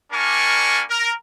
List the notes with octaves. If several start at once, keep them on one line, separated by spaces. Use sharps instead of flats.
G3 A#3 D4 A#4 G#5 C#6
A#4